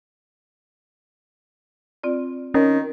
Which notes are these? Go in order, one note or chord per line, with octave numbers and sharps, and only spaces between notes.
C4 F4 D5
D#3 C#4